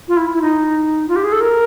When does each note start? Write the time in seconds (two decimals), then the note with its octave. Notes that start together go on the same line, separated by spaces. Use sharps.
0.08 F4
0.17 E4
0.34 E4
0.41 D#4
1.08 F4
1.16 G4
1.24 G#4
1.32 A4
1.41 A#4